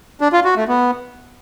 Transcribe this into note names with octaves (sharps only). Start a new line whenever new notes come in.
D4
F4
F#4
A3
B3